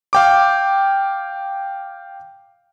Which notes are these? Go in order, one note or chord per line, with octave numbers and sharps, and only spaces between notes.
F5 G5 D6